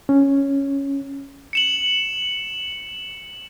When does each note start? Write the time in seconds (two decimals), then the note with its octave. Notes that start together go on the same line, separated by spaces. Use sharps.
0.09 C#4
1.53 C#7 E7 F#7